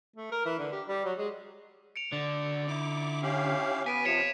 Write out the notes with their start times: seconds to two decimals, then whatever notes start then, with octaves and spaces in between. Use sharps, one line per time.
0.16 A3
0.31 A#4
0.46 E3
0.58 D3
0.72 G4
0.88 G3
1.05 F#3
1.18 G#3
1.96 C#7 D7 F7
2.13 D3 F#4 D5
2.68 D#4 E4 D6
3.23 C#4 G4 F5
3.86 B3 G#5 B6 D7 D#7
4.05 C3 F3 C#5 B6 C#7 E7